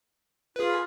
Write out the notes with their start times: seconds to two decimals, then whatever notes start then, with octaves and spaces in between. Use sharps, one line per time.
0.56 F4 G#4 B4